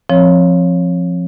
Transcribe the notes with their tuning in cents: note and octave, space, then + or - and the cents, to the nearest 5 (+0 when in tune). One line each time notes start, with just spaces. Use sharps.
F3 +0 C4 +30 C#5 +0